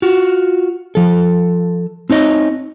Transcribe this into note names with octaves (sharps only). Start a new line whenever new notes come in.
F4 F#4
F3 A4
C4 D#4 C#5 D#5